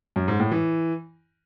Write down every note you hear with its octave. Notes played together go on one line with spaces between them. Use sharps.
F#2
G#2
A2
E3